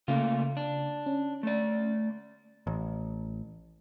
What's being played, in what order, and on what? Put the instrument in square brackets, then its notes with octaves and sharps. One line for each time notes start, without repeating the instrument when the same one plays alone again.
[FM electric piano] C#3 [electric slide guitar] A3 A#3 F4
[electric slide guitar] D4
[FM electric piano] C#4
[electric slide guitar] A3 D5
[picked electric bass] A1